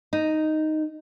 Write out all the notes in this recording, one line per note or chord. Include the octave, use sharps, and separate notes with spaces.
D#4